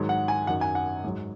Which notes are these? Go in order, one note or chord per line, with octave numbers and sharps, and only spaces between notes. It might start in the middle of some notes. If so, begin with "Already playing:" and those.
Already playing: G#2 D#3 F#3
F#5
G#5
F#2 D#3 F#3 F#5
G#5
F#5
G#2 F#3